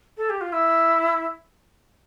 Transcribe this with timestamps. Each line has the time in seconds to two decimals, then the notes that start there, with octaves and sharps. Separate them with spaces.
0.17 A4
0.29 G4
0.41 F4
0.52 E4